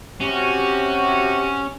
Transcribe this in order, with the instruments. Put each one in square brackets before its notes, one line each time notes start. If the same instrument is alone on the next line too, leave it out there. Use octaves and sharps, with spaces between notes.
[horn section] C3 F#4 [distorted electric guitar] C#4 [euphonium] G4